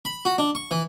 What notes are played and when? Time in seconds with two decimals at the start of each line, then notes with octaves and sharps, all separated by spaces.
0.05 B5
0.25 F#4
0.38 D4
0.55 C#6
0.71 E3